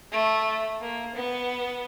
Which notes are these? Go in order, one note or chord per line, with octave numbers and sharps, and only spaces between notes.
A3
A#3
B3